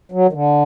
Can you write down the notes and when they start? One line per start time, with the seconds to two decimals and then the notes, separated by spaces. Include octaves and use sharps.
0.12 F#3
0.28 D#3
0.33 D3